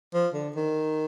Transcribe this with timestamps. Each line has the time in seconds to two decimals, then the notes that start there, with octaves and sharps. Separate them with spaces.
0.14 F3
0.34 D3
0.56 D#3